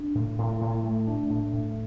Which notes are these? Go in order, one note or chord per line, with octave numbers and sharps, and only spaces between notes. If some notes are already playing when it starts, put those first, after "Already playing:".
Already playing: D4
A2
A2
A2
A3
D4
A2
A2